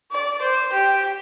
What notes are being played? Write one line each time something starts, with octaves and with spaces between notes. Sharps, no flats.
D5
C5
G4